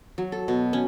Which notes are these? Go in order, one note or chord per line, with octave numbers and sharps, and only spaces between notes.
F#3
A4
B2
C#4